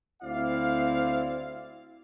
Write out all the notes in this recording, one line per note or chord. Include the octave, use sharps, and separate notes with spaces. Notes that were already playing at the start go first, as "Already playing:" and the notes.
D2 C4 E4 D5 F5